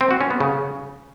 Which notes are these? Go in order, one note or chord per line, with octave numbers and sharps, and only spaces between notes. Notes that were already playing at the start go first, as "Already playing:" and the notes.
C4
F#4
C#4
B3
C#3